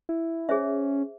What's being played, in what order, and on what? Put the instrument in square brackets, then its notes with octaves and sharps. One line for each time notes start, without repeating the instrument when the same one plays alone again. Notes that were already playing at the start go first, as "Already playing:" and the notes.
[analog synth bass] E4
[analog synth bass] C#4 [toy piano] G#4 C5 E5